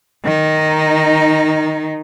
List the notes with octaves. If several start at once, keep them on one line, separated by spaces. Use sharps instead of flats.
D#3 D#4